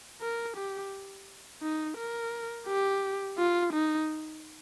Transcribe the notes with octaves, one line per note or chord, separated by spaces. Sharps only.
A#4
G4
D#4
A#4
G4
F4
D#4